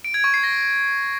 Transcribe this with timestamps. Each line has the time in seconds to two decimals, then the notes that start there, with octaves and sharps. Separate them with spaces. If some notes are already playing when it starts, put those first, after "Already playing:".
0.04 D7
0.14 G#6
0.24 C#6
0.34 C7
0.44 A#6